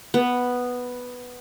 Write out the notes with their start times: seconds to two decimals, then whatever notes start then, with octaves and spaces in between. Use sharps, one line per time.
0.14 B3